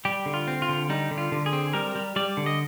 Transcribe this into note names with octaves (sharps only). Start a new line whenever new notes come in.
G3 G4
D3
F4
C4
F4
D3
G3 D#4
D3
F4
D3
G#4
C4
G3 A#4
G3
G3 D5
D3
D#5